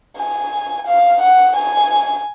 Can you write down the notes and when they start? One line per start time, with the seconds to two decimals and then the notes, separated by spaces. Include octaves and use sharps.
0.17 G#5
0.87 F5
1.22 F#5
1.56 G#5